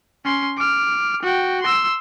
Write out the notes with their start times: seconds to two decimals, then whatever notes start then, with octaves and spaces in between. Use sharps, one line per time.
0.25 C#4 C6
0.57 D6 F6
1.23 F#4 G5
1.63 C6 E6